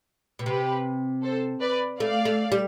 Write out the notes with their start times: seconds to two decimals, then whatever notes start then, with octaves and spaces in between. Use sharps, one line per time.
0.39 B2
0.46 C3 G4 B4
1.23 A4 C5
1.62 B4 D5
2.00 A3 D5 F5
2.25 A3
2.52 G3